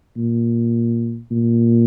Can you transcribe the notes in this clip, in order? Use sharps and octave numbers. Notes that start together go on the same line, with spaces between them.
A#2
A#2